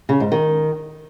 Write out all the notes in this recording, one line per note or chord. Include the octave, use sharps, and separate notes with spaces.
C#3
G#2
D#3